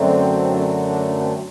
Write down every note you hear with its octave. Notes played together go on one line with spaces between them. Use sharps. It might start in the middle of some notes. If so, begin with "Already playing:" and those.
Already playing: F#2 D3 F#3 A3 C4
D4
C4
D4
C4